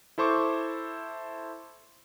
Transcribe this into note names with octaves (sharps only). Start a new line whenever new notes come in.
E4 A4 C5 C#6 D6